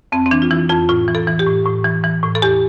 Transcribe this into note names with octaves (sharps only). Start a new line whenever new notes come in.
F2 C4
C4
E3 D4
F4
E3 E4
F2 F4
A2 F4
E3
A4
E3
G4
A2
A2
E3
E3
A2
A4
E2 G4